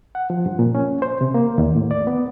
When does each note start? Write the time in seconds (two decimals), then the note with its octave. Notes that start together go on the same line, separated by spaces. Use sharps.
0.15 F#5
0.30 F3
0.46 G2
0.59 A#2
0.75 C#4
1.02 C5
1.21 C3
1.34 A#3
1.58 D#2
1.76 A2
1.91 D5
2.07 B3